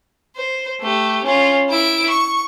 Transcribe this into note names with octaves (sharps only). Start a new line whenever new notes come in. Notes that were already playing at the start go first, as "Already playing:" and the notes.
C5
A3 G4
C#4 F4
E4 D7
C#6